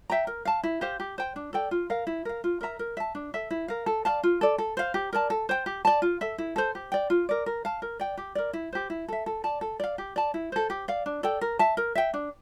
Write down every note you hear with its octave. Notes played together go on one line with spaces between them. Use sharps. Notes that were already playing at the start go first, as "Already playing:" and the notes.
E5 G5 A#5
A#4
F5 A5
E4
G4 C5 F5
G4
C5 G5
D4
A4 D5 G5
F4
A#4 F5
E4
A#4 F5
F4
A#4 E5 A#5
A#4
E5 A5
D4
A4 E5
E4
A#4 F5
A4
D5 F5 A5
F4
A4 D5
A4
C5 F5
G4
A#4 D5 A5
A4
C5 G5
G4
D5 A5
F4
A4 E5
E4
A4 C5
G4
D5 G5
F4
A#4 D5
A#4
F5 A5
A#4
D5 G5
G4
A#4 D5
E4
G4 C5
E4
A4 E5
A4
D5 A5
A4
D5 F5
G4
D5 A5
E4
A4 C5
G4
D5 F5
D4
A4 D5 G5
A#4
E5 A5
A#4
E5 G5
D4